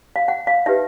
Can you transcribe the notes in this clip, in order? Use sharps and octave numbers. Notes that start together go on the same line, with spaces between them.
F5
F#5
F5
D#4 G4 B4 E5